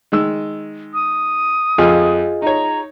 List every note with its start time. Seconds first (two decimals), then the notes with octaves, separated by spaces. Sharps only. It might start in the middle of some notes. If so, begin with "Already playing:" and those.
0.12 D#3 G#3 E6
0.94 D#6
1.78 F2 F4 G#4 D#5
2.42 D#4 C#5 A#5